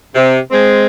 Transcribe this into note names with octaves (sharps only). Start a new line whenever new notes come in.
C3
G#3 C4